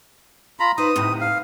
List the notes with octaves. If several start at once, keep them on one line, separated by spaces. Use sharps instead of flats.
F4 A#5 B5
D#4 B4 C5 D#6
D2 A2 C3
F5